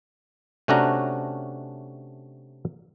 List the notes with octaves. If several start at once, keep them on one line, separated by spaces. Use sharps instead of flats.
C3 A3 C#4 D4 F#4 A#5